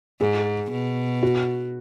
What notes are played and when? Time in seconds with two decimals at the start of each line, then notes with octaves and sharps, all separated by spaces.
0.20 G#2 G#4
0.72 B2
1.23 F#4